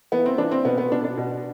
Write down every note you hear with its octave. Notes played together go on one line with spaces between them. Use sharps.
E3 B3
C4
E3 D4
C4
B2 B3
B3
B2 D4
D4
B2